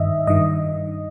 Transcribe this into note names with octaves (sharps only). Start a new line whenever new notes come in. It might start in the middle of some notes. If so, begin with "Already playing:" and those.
Already playing: G2 D#3 D#5 E5
G2 D#3 D#5